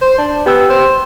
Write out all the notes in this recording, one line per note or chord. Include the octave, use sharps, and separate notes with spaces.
C5
D4
B3 G4 G5 E6
C5